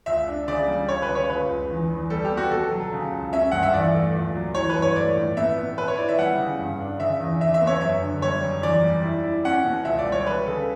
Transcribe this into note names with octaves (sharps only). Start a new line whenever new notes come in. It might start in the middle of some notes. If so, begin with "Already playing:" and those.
C#2 E5
D4
C#3 D5
G3
C#2 C#5
B4
C#3
C#5
C#2 B4
C#2
E2
E2
G3 A4
G4
B3
F#4
B2 A4
F#3
C#3
C#2
C#4 E5
G2 F#5
E5
E2 D5
A3
C#2
F#3
E3 C#5
B4
G2
C#5
A3 D5
A2
B3 E5
B3
B3 B4
C#5
E4 D5
E5
G3 F#5
C#3
G2
D4
C#3 E5
E2
C#3 E5
E5
B3
C#5
F#2 E5
D3
G3 C#5
F#2
E2 D5
G3
E4
E4
C#4 F#5
B2
C#2 E5
D5
G3
C#5
G3 B4
C#3 A4